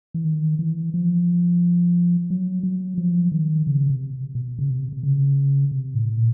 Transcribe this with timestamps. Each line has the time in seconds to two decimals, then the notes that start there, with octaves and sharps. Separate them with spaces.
0.14 E3
0.24 D#3
0.59 E3
0.94 F3
2.30 F#3
2.63 F#3
2.98 F3
3.32 D#3
3.67 C#3
3.90 C3
4.35 B2
4.59 C#3
4.69 C3
4.92 C3
5.03 C#3
5.71 C3
5.95 A2
6.17 A#2